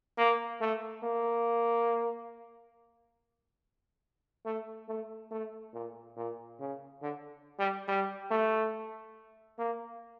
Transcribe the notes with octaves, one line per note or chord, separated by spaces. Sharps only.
A#3
A3
A#3
A3
A3
A3
A#2
A#2
C#3
D3
G3
G3
A3
A#3